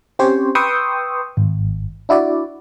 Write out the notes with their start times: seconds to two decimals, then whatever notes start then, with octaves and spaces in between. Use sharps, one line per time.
0.19 C4 C#4 G4 C5 C#5
0.55 B4 G5 C6 C#6 D#6 E6
1.37 G#1
2.09 D4 E4 F#4 D5